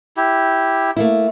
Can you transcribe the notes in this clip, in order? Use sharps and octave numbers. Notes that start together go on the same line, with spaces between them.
E4 G4
A3 A#3 E4